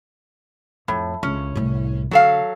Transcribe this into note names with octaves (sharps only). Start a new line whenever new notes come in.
F2 A2
C#2 C#4
C2 A2
D3 F#3 A4 F5